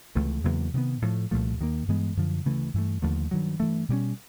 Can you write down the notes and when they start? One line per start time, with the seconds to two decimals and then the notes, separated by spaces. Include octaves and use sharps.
0.15 C#2 C3 E3 A3
0.44 E2 C#3 F#3 A#3
0.73 C3 D#3 F#3 B3
1.02 A2 F3 A3
1.31 C2 A#2 F3 A3
1.60 D#2 D#3 F#3 A#3
1.88 G2 E3 G#3 B3
2.16 F#2 D3 F3
2.45 D2 C#3 E3 A3
2.74 G2 E3 A3
3.02 D#2 D3 F3 A3
3.31 G2 D#3 F#3
3.60 G2 E3 A3
3.89 B2 G3 A#3 C#4